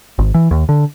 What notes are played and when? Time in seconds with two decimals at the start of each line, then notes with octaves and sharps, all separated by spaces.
0.18 G#1
0.34 E3
0.51 D#2
0.69 D3